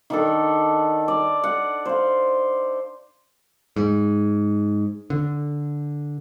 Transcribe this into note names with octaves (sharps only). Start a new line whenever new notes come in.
D#3 D4 A4
D5
F#5
C5 F5
G#2
D3